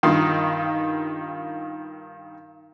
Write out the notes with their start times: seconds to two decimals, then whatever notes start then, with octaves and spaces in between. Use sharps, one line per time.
0.03 G2 D#3 F4 F5 C6